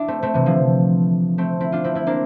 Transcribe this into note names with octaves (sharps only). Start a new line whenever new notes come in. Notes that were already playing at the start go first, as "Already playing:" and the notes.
Already playing: D4 E4
A3 C4
A3 C4
C3 E3
D3 F3
A3 C4
C4 E4
D4 F4
C4 E4
C4 E4
A#3 D4